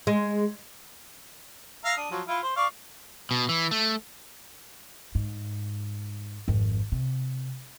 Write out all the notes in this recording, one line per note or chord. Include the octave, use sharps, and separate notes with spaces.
G#3
E5 F5 A#5
D4 D#6
F3 F#3
E4 F4
C5
D5 F5 C#6
B2
E3
A3
G#2
G#1 F2
C3